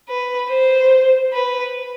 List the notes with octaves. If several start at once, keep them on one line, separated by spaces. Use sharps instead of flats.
B4
C5
B4